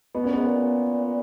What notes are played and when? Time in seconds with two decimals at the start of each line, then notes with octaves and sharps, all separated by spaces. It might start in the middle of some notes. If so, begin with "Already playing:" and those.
0.14 B2 B3
0.24 A#2 C#4
0.34 G#2 B3
0.46 A#2